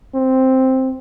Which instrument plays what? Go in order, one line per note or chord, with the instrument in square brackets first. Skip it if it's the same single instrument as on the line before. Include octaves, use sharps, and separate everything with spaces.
[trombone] C4